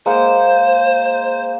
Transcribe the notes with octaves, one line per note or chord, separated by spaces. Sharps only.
G#3 A#3 C5 F#5